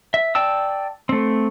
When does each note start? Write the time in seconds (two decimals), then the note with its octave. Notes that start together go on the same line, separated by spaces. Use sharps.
0.14 E5
0.35 D5 G5 A5 E6
1.09 A3 C4